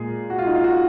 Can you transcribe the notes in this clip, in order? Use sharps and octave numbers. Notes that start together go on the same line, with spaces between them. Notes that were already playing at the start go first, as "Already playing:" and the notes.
Already playing: A#2 G#3 G#4
F#4
F4
D#4
F4
F#4